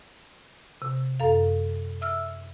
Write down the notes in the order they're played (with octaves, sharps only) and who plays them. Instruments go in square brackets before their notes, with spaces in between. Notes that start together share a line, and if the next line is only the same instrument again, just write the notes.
[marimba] C3
F#2 A4 F5
E5 E6 F6